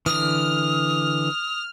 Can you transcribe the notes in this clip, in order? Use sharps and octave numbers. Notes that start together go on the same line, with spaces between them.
D3 E3 D#6 F6